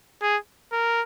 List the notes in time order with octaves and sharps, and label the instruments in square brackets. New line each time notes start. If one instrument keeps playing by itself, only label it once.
[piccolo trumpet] G#4
A#4